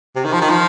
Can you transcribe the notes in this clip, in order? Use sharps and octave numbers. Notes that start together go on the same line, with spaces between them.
C3
D#3
F3
D#3
F3